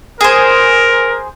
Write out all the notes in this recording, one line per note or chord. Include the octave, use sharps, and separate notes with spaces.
G#4 A#4 C5